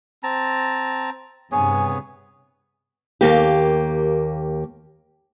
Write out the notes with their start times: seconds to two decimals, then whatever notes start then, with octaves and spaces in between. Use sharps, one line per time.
0.23 C4 A5 A#5
1.52 G2 C3 B3 G#4 C#5 G#5
3.21 D#2 A#3 G4